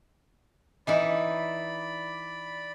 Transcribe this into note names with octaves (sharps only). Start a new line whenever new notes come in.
E3 D#4 E4 D5 B5